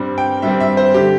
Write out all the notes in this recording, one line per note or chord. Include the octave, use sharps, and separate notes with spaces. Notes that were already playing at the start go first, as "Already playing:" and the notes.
Already playing: G2 G3 C4
G5
G2 G3 C4 E5
E5
C5
D3 G4